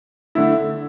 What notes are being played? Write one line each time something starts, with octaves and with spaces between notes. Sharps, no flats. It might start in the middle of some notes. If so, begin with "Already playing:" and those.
D3 A3 E4